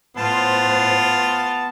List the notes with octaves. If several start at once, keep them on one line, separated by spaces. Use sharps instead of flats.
A2 B3 F4 C5 A5